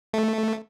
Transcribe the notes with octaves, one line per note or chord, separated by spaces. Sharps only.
A3